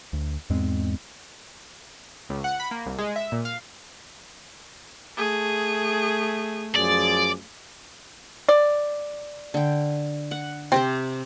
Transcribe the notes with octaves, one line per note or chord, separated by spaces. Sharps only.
D2
E2 G#2 G#3 C4
C#2
F#5
B5
A#3
C2
G#3
E5
A#2
F5
A3 G#4
F#2 F3 G#4 D5
D5
D3 G5
F#5
C3 C4 G4 C5